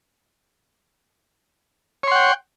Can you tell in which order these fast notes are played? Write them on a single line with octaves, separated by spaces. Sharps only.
C#5 C6 F#5 G5